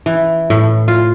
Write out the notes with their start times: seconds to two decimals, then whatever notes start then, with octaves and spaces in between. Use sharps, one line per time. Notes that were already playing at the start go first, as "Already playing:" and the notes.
0.06 E3
0.50 A2
0.88 F4